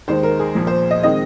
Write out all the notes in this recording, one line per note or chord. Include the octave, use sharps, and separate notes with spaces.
D#2 D#3 G#3 C5
A#4
G#4
A#1 A#2 F3
C5
D#5
D#3 G#3 C4 D#5